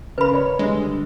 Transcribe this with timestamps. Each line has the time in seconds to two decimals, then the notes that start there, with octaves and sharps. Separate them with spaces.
0.18 C#3 A#4 B4 B5
0.34 C#5
0.59 D3 G3 G#3